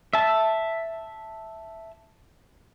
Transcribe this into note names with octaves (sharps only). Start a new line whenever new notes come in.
E5 A5